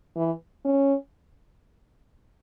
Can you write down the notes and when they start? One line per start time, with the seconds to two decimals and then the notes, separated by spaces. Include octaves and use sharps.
0.16 E3
0.65 C#4